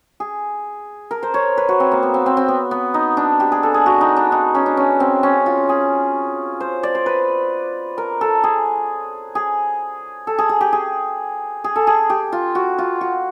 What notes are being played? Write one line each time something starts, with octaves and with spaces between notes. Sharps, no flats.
G#4
A#4
C5
C#5
B4
F#4
C4
A#3
B3
C4
C4
C4
B3
B3
D#4
D4
G4
G#4
A4
G#4
F#4
D#4
D4
D#4
C#4
D4
C#4
C4
C#4
F4
G#4
C5
D5
C5
B4
A#4
A4
G#4
G#4
A4
G#4
G#4
G4
G#4
G#4
A4
G#4
G4
F4
F#4
F4
F#4